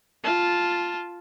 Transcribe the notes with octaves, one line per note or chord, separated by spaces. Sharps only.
F4 A5